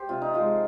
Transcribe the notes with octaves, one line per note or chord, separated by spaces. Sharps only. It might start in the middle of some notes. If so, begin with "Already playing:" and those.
Already playing: G4 C5
C3 F4
D#4
F3 G#3 F4